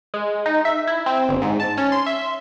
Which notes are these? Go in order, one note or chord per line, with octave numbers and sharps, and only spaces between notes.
G#3
D#4
E5
E4
C4
G1
G#2
A5
C#4
C6
E5